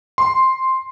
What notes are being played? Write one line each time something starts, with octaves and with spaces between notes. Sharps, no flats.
C6